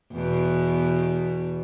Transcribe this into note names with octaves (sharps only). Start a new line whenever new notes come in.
E2 B2